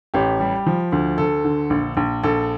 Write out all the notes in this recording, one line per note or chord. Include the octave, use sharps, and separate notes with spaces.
A1 G4
G3
F3
D2
D2 A4
D3
A#1
A#1
A#1 A4